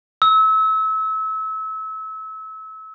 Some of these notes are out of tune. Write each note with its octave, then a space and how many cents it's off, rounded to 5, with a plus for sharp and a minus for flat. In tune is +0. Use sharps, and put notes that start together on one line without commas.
E6 -30